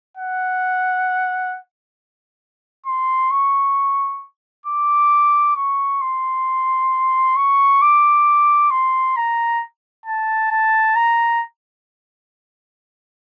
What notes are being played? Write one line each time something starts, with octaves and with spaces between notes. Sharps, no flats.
F#5
C6
C#6
D6
C#6
C6
C#6
D6
C6
A#5
A5
A5
A#5